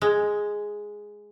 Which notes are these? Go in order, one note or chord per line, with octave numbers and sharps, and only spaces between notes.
G#3